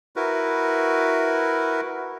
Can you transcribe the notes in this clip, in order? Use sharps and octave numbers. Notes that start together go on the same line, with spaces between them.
E4 F#4 A#4 B4